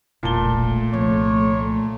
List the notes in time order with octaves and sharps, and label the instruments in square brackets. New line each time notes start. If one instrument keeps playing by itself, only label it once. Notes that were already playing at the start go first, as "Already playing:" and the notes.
[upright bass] E1 A#1 [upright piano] A#2 A5 G7 [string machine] A3
[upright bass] C2 F3 [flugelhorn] C#5